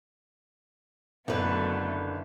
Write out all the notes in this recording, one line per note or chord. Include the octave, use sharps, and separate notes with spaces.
F#1 D3 F#3 A3 B3 B4